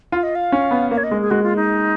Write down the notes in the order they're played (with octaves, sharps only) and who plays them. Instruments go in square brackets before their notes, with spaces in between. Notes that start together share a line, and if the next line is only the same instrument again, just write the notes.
[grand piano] F4 [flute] F5
[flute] D#5
F5
[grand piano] C#4
B3
[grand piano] A#3 [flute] F5
[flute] C#5
D#5
[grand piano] G#3
[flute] G#4
[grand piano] G#3 [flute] F#4
[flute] F4
D#4